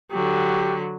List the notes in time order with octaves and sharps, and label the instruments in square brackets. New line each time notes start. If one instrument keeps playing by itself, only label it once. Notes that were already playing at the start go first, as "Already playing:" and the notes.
[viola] D3 F#3 [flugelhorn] G4